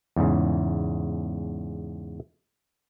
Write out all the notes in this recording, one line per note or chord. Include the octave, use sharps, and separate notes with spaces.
E2 G#2 C#3